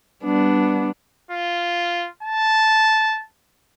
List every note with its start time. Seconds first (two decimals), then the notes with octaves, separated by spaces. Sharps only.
0.24 G3 B3 D4
1.31 F4
2.23 A5